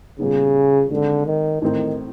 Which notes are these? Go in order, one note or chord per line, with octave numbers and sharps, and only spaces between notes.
A#2 C#3 G3 B3 D#4
D3 D#3 G#3 C4
D#3
A2 D#3 E3 A3 C4 D#4